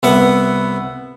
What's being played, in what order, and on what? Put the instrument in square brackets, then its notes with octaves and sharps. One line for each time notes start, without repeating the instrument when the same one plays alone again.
[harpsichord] C2 B3 E5 F#5